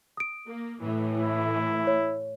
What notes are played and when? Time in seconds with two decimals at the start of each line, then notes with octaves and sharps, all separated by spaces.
0.17 D#6 D7
0.48 A#3
0.81 A2 E3
1.16 E4
1.87 C#5